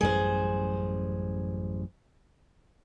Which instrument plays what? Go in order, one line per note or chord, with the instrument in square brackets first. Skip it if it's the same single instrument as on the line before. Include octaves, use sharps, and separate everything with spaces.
[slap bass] A1 F#2 G3 [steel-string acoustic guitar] G#4 C5